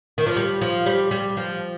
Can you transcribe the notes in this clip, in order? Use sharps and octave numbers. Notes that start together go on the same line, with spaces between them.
D#3
F3
G3
F3
G3
G3
F3